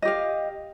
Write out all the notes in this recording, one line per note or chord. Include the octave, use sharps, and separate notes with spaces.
G4 D#5 F5